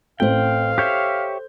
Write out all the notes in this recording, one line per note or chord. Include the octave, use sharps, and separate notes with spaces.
A1 C4 A4 C5 F5 G5
G4 C#5 E5 G6